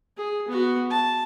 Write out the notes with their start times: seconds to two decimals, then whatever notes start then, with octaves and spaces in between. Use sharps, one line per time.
0.17 G#4
0.48 B3 F#4
0.91 A5